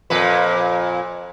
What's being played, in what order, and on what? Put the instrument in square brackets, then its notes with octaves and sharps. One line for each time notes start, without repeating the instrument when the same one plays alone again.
[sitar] F2 A#2 B4